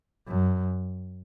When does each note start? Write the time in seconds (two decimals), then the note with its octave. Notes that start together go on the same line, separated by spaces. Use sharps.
0.28 F#2